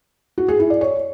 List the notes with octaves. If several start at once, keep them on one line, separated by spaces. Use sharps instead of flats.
F#4
G#4
E4
D5
C#5